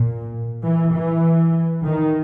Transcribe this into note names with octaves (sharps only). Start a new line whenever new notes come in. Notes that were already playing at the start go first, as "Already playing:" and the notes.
Already playing: A#2
E3
E3
D#3